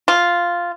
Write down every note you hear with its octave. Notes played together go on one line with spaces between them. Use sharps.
F4